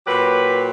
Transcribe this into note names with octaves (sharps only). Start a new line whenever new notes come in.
A#2 F#3 G4 B4